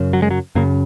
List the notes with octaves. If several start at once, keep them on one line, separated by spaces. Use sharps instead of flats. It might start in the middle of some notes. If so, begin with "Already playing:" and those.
Already playing: F#2 C#3
F#3
G#3
F#3
F#2 C#3 A#3